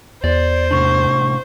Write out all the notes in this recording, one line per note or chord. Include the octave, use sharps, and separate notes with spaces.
E2 C5 D5
A2 C3 D4 C#6